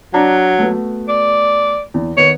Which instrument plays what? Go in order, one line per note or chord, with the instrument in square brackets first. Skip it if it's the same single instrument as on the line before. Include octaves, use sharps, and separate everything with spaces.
[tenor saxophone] F#3 [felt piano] D4 A#5
[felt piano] A3 B3 F#4
[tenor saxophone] D5
[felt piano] E2
[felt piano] D#3 B3 [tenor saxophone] C#5